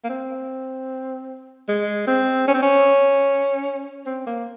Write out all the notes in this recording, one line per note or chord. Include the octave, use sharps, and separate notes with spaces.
A#3
C4
G#3
C4
C#4
C4
C#4
C4
A#3